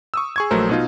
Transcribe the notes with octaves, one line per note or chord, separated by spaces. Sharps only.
C#6 D#6 E6
G#4 C#6 G#6
A#1 F#3 A3 A#4 C5
B2 D#4 F4